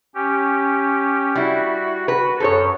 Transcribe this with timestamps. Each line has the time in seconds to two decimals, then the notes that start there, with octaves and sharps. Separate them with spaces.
0.15 C#4 G4
1.35 G3 E4 F#4
2.08 F#4 B4
2.40 F#2 A4 C5 C#5